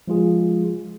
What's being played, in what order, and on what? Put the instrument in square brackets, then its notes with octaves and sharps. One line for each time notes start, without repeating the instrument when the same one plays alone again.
[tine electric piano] F3 G#3 F4 G#4